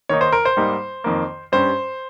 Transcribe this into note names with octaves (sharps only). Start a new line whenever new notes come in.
D#3 A#3 D#4 C#5
C5
A#4
C5
G#2 G3 A#3 D#4
F2 D#3 A#3
G2 G3 C#4 C5